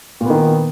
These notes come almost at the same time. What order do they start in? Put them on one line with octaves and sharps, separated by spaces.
A#2 B3 D#3